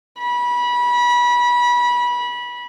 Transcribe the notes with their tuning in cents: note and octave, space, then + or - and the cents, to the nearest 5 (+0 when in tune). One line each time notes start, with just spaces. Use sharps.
B5 -25